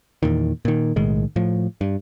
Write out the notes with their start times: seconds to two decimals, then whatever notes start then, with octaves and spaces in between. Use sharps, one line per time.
0.23 E2 A#2 D#3
0.65 A#2 D#3
0.96 B1 A2 D#3 G#3
1.36 A2 F3
1.81 G2